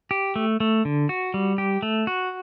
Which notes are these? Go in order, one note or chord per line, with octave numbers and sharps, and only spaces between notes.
G4
A3
A3
D3
F#4
G3
G4
A3
F#4